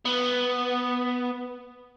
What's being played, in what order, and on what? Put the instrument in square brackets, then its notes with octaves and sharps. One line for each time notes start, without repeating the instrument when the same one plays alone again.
[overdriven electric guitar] B3